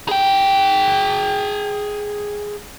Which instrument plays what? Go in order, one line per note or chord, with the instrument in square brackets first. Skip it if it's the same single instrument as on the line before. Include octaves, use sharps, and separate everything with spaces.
[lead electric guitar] G#4 G5